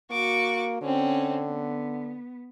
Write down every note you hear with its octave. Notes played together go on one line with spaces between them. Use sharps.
A#3 F#4 C#6 D6
D3 C4 C#4
B3